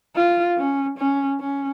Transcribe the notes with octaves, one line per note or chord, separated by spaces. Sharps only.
F4
C#4
C#4
C#4